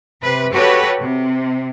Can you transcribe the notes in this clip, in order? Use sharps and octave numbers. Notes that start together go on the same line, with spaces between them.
C3 B4
F#4 G4 A4 B4 C#5
C3